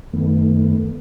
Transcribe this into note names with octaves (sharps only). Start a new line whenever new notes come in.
F#2 D#3 A3 B3